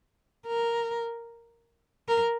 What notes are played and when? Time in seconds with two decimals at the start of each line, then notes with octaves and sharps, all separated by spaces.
0.47 A#4
2.08 A#4